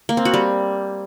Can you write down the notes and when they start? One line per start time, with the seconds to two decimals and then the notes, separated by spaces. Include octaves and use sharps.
0.09 A#3
0.17 C4
0.25 F#4
0.34 G3